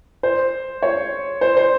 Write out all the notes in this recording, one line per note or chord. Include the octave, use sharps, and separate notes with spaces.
C5
C#5
C5
C5